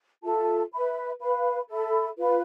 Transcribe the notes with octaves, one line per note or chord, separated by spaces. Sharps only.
F4 A4 E5 A5
B4 E5 B5
B4 F5 B5
A4 E5 B5
F4 B4 F5 B5